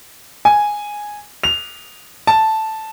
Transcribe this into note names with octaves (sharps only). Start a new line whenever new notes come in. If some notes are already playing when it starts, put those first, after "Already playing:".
G#5
F7
A5